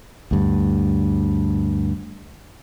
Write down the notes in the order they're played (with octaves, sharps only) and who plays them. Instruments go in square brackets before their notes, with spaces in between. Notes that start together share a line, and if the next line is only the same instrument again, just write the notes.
[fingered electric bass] D2 G2